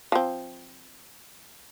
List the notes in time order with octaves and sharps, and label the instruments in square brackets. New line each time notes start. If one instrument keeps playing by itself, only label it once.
[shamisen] F3 C4